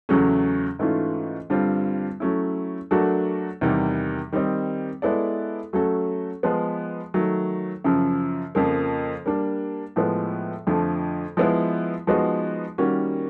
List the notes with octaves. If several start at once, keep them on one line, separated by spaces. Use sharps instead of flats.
E2 C#3 F#3 A3 C#4
G#2 E3 A3 C#4 F4
G2 D3 G3 C4 F4
F#3 A3 C#4 E4
F#3 A3 D4 F#4 A#4
E2 C3 D#3 G3
D#3 G3 C4 D#4
G#3 B3 E4 A4 D5
F#3 A3 C#4 F#4 A4
F3 G#3 B3
D#3 F#3 A3
F#2 C#3 F3
F2 C#3 F3 A#3
G3 A#3 D4
A2 F3 G#3 B3
F2 D3 F3 A3
F3 G#3 B3 E4
F3 G#3 B3 D#4 F#4
D#3 G3 A#3 C#4 F#4